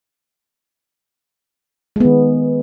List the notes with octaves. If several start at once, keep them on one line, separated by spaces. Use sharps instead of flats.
D#3 G#3 B3